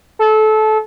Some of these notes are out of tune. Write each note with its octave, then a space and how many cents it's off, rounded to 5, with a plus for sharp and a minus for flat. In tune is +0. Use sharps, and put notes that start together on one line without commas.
A4 -25